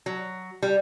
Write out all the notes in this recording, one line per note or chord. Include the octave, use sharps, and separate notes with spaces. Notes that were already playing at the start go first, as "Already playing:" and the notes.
F#3
G3